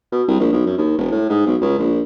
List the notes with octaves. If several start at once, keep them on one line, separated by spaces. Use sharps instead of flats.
B2
C2
A#1
B1
F#2
D#2
E1
A2
G#2
B1
C#2
A#1